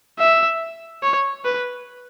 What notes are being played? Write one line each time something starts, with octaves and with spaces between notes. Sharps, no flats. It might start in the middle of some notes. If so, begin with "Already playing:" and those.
E5
C#5
B4